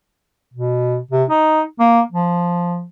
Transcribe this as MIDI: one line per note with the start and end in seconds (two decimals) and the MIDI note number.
0.54 0.98 47
1.11 1.24 48
1.30 1.62 63
1.79 2.01 58
2.12 2.85 53